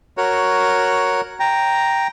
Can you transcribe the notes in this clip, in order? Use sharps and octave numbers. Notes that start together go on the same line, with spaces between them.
F#4 A#4 C#5
G5 A#5